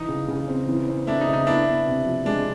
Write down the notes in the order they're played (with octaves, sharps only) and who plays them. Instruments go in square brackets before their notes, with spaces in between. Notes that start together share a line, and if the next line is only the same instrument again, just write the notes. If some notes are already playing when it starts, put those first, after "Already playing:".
Already playing: [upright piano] E3 [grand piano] D#4
[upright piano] C#3
C#3
C4
E3
C4
[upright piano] A3 [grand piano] D4 E4
[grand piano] D#4
[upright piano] C#3
[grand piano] D#4
[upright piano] B3 [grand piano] D4 E4
[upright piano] B3
C3
F3
[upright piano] G#3 [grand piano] D4